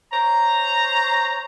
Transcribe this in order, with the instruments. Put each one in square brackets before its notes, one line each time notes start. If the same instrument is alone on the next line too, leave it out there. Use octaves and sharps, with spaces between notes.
[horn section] C5 C#5 A#5